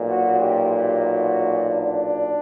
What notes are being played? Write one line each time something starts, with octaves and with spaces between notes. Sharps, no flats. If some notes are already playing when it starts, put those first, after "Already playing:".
Already playing: B1 A#2
F#4
G4
G4
F#4
D4